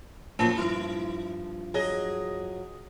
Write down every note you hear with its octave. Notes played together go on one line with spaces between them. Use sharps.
A#2 F3 F#3 A#3
G2 F3 E4
F#3 G#4 D#5